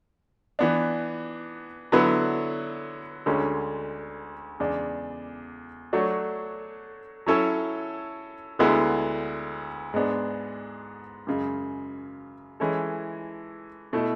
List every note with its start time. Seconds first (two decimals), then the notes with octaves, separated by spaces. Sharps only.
0.59 E3 B3 D4
1.92 D3 F#3 B3 E4 B4
3.26 D2 D3 G#3 C#4
4.60 E2 C#3 G#3 D4
5.93 F#3 A3 D4 F#4 C#5
7.26 F#3 C#4 E4 A4 C#5
8.59 D2 D3 G#3 B3 E4
9.94 G#2 G#3 B3 D4
11.27 F#2 C#3 G#3
12.60 E3 G#3 C#4 E4 A4
13.93 B2 A3 E4